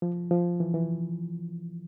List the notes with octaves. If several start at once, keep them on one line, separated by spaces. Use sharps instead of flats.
F3
F3
E3
E3